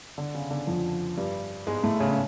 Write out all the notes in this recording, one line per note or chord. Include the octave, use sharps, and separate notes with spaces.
D3
C#3
D3
F2 F3
G2 G3
G#2 G#3
A2 A3
C#3 C#4
C#4